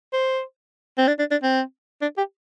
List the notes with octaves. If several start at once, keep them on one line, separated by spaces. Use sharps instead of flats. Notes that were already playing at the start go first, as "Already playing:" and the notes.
C5
C4
D4
D4
D4
C4
D4
G4